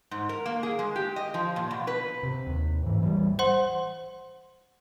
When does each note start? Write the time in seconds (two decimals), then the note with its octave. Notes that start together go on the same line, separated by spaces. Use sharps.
0.11 G#2
0.29 A#4
0.46 A#3
0.63 G#4
0.79 G#3
0.96 G4
1.16 D#5
1.34 F3
1.56 A#2
1.71 B2
1.87 B4
2.23 C3
2.47 D#2
2.83 G#2 E3
3.02 A1 E3 F#3 G3
3.39 C5 F#5 C6